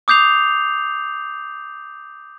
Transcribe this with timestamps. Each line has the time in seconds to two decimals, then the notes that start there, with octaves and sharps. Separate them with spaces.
0.08 D6 D#6 G6 C7 F7